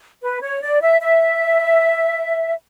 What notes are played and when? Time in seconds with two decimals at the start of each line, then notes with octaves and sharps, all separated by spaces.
0.23 B4
0.42 C#5
0.62 D5
0.81 E5
1.01 E5